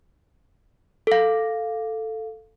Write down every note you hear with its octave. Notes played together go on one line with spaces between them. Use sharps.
A4 F5